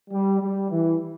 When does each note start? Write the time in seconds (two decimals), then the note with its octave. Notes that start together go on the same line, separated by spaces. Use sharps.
0.11 G3
0.40 G3
0.70 E3